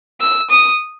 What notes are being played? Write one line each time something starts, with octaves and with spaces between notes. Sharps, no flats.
E6
D#6